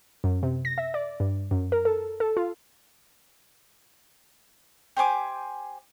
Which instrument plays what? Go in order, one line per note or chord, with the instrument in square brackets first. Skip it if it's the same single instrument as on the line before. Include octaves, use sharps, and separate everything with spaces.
[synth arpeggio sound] F#2
C3
A#6
E5
D5
G2
F#2
A#4
A4
A4
F4
[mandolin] G4 C5 G#5 D6